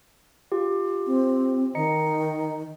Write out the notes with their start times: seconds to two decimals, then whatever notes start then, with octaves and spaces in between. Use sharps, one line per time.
0.52 F4 G4
1.06 C4
1.75 D#3 D#5 A#5 C#7